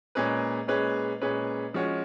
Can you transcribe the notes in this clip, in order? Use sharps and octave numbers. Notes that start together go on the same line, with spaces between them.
A#2 G#3 C#4 G#4 B4
A#2 G#3 C#4 G#4 B4
A#2 G#3 C#4 G#4 B4
F3 G#3 C#4 F#4